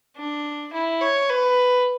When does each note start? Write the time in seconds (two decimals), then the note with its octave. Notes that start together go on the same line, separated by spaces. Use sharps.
0.17 D4
0.73 E4
1.01 C#5
1.30 B4